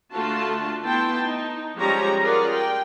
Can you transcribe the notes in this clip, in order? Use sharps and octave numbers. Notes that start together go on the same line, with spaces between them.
D3 A3 F4 F#4 A5
B3 E4 G5 A5 C6
D#4
F3 G3 G#3 C#4 C#5 A#5
F4 G#4 A#4 D5 F#5
G5